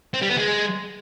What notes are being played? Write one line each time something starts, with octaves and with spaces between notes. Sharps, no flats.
C4
G3
B3
G#3